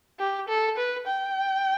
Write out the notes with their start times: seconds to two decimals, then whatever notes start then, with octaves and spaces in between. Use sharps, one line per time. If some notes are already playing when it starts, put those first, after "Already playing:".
0.19 G4
0.48 A4
0.77 B4
1.07 G5